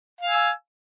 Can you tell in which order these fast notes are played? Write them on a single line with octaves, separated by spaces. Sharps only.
F5 G#5 E6